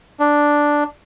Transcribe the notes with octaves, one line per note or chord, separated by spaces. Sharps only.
D4